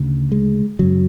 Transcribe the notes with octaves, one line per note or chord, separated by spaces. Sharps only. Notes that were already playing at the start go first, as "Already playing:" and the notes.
Already playing: D2 C#3
G#3
F#2 C#3 F#3